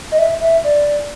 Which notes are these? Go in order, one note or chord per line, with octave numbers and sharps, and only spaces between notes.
D#5
E5
E5
D5